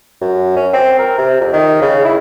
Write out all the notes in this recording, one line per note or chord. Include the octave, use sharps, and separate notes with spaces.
F#2
C#4
C4
A#4
C3
F2
D#3
C#3
E4